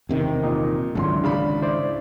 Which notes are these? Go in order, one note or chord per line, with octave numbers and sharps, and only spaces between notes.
E1 C3 D#3
A#2 D#4
G#1 C#2 F#2 D3 E4 C6
C#3 D4 B5
E4 C5 D5